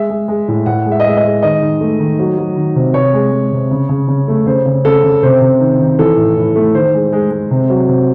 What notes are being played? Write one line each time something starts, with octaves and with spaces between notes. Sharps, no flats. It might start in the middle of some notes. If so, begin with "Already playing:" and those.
Already playing: G#3 E5
G#3
G#3
A2
A2 F#5
G#3
E5
D#5
G#3 E5
D#5
G#3
D#3 D#5
D#3
A3
D#3
F#3
F#3
D#3
C3
C3 C#5
G#3
G#3
C3
C#3
C#3
C#3
A3
C#3 C5
C#3
C#3 A4
C#3
C3 C5
C3
D#3
D#3
E3 A4
A2
A2
A3
D#3 C5
G#3
G#3
G#3
C3
F#3
C3